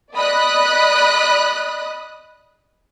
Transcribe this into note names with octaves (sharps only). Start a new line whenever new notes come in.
D5 D#5 B5 D#6 F#6